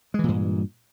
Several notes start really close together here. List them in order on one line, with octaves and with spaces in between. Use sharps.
G#3 E3 A#2 G2